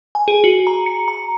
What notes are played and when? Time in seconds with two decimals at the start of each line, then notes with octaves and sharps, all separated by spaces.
0.15 G#5
0.28 G#4
0.44 F#4
0.67 A#5
0.86 C#7
1.08 A#5